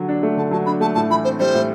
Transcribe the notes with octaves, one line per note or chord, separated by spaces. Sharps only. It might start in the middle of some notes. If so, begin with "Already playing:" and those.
Already playing: D3 F#3
D4
A3
D3 A5
F#3 A5
D4 B5
A3 A5
A2 A5
E3 B5
C4 C5
G3 C5
A2